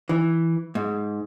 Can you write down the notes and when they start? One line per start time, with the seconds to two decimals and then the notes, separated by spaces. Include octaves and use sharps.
0.09 E3
0.75 G#2